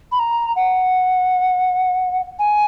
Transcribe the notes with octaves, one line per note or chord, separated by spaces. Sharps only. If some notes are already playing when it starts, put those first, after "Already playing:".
B5
A#5
F#5
G#5